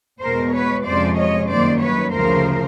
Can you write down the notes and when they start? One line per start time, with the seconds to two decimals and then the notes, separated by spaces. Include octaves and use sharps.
0.22 E2 B2 G#3 A#4 C5
0.54 B4 C#5
0.86 F2 C3 F3 G#3 C#4 C5 D5
1.18 C#5 D#5
1.50 F#2 D#3 G3 A#3 C5 D5
1.81 B4 C#5
2.13 D2 C#3 F3 A#4 C5